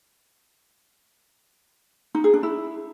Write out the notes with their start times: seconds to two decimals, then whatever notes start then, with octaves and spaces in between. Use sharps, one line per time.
2.15 D#4
2.24 G#4
2.34 D4
2.43 E4